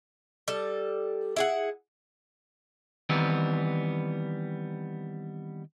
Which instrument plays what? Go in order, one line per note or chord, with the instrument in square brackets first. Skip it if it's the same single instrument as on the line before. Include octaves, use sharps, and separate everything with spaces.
[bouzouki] G3 A4
E4 G#4 F#5
[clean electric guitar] D#3 E3 G3 B3 C4